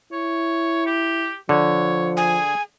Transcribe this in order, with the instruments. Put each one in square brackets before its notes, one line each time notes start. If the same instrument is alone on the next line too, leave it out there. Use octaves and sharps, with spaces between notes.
[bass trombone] E4 [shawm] C#5
[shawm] G4
[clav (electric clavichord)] D3 [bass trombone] F3 [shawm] C#5
[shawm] G#4 [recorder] G#5